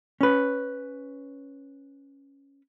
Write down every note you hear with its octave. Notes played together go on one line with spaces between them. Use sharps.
C#4 B4